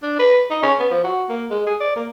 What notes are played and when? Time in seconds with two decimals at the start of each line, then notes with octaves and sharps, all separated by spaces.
0.02 D4
0.19 B4
0.50 D#4
0.62 C#4
0.79 B3
0.91 F3
1.04 F#4
1.29 A#3
1.50 G#3
1.66 G#4
1.80 D5
1.96 A#3